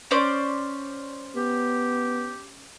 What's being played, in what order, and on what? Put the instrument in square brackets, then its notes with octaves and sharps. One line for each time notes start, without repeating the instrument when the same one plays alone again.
[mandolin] C#4 C5 D5
[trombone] B3 [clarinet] G4